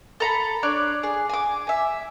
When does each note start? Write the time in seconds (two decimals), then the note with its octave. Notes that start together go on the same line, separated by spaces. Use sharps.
0.20 A4 A#5 B5
0.63 D4 C#5 D5
1.03 G#4
1.29 G#5 D6
1.67 E5 G#5